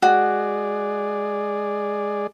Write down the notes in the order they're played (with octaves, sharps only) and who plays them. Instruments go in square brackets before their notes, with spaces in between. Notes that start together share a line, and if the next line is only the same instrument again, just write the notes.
[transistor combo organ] G#3 G#4 D5 [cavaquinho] F#4